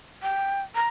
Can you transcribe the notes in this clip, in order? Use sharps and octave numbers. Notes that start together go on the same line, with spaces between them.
G5
A#5